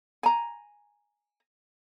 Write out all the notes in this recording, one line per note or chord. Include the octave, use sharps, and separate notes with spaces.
G#5 A#5